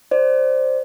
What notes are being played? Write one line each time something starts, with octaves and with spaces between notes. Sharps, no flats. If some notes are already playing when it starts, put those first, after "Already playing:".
C5 D5